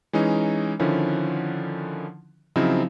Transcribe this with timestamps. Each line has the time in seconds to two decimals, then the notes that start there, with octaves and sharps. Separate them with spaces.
0.13 E3 G#3 C#4 D#4
0.79 D3 D#3 F3 C#4 E4
2.56 C#3 F3 F#3 C4 D#4 E4